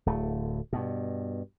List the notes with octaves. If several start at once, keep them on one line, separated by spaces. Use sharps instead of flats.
D1 A3
G2 B2